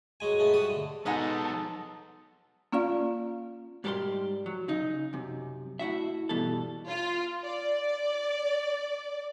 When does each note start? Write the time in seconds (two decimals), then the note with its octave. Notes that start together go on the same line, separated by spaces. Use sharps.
0.20 F#3 G#3 G#5
0.39 G#3 A3 B3
0.53 G3 F#4 D#6
0.70 D3
1.06 F#3 G#3 B3 D#4 A4 F#5
2.72 A#3 C#4 F4 D5 F5
3.84 G#2 G3 G4 A4 A#4 C6
4.46 F#3
4.68 C#3 D#4
5.13 F#2 C3
5.79 A2 E4 F#4 E5
6.29 G2 B2 E3 G3 A4
6.87 F4
7.44 D5